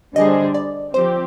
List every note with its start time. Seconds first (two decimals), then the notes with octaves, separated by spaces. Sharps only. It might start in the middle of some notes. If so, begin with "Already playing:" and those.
0.15 D3 G3 D4 G#4 C5 D#5
0.54 D5
0.94 F3 C4 G4 C5